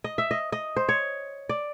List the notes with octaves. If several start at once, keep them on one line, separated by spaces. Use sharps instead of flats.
D#5
E5
D#5
D#5
C5
C#5
D5